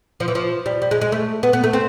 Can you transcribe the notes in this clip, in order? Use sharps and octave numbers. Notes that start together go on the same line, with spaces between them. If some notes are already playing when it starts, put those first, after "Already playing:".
F3
E3
F3
G3
G3
G#3
G#3
A3
B3
B3
A3
C4